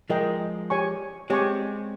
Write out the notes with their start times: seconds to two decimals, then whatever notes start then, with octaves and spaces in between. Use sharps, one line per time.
0.10 F3 G#3 A#4 D#5 G5
0.70 G4 C#5 G#5 C#6
1.30 G#3 C4 G4 C#5 G#5 C#6